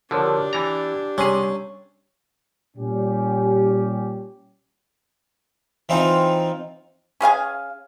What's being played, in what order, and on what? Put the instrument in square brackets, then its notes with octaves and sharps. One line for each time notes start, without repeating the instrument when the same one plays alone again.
[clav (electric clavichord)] D3 F3 [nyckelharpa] D4 G4 [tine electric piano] F#4 A#4 C#5
[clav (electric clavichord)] E3 A#5 [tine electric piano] G#6 A6
[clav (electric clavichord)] C3 G#4 [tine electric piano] G3 [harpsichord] C#4
[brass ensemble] A#2 G3 C#4 G4
[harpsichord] E3 C4 D#4 F4
[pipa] C#4 G#4 F5 G#5